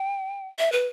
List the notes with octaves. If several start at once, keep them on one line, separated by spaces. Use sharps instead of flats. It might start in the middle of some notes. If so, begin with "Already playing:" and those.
Already playing: G5
E5
B4